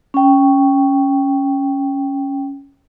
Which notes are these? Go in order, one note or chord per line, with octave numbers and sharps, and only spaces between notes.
C#4 G5